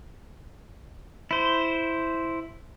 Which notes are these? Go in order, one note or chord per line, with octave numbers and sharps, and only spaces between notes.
E4 C5